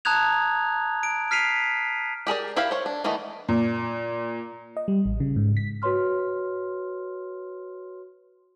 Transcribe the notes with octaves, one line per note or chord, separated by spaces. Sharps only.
A5 A#5 D#6 F#6 G#6 F7
D7
F6 B6 C7 D#7 F7
G4 G#4 A#4 D5
E4 G4 A#4 E5 F5
C5 C#5
D4
D#3 E3 A3 B3 D#4
A#2
D#5
G3
A1
C#3
G#2
B6
F#4 B4 C#5 C6 F6